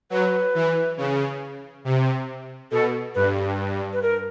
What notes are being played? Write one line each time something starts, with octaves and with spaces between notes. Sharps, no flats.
F#3 B4
E3
C#3
C3
B2 A4
G2 B4
B4
A#4